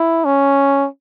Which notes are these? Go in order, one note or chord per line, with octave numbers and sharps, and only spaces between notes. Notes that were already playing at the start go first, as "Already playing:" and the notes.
Already playing: E4
C#4